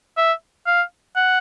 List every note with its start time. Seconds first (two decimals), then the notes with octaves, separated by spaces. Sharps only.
0.17 E5
0.67 F5
1.16 F#5